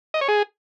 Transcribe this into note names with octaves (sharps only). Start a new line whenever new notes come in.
D#5
C#5
G#4